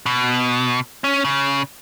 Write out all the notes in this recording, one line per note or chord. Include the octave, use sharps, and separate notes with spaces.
B2
C#4
C#3